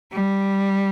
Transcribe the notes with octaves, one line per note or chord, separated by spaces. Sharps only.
G3